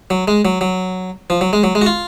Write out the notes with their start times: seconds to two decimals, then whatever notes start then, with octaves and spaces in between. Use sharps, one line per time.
0.10 F#3
0.28 G#3
0.45 F#3
0.61 F#3
1.30 F3
1.41 F#3
1.53 G#3
1.64 F#3
1.75 G#3
1.82 F#4
1.86 F4